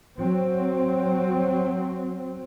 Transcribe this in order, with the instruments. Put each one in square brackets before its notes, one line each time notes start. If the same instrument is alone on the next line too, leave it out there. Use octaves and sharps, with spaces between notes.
[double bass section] F#3 C4